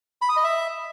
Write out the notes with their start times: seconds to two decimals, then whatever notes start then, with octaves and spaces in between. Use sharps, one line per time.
0.22 B5
0.29 D#6
0.37 D#5
0.44 E5